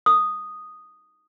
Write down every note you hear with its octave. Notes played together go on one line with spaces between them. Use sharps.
D#6